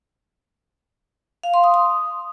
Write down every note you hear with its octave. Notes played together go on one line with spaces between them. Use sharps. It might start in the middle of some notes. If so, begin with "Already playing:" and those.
F5
C6
D#6
D#6